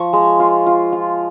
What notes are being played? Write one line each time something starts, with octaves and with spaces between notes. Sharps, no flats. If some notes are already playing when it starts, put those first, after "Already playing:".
Already playing: F3 C#6
G#3
F4
F4
F4